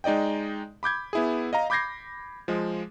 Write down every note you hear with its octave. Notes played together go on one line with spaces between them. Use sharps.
G#3 D#4 D5 D#5 G5
B5 D6 G6 G#6
B3 E4 G#4
D#5 F5 A#5
B5 D6 G6 G#6 A#6 C7
F3 G#3